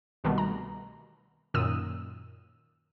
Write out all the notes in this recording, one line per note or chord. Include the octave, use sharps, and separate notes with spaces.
C2 B2 D#3 G3 A3
A#5
F#2 A#2 D#3 D#6 E6 D#7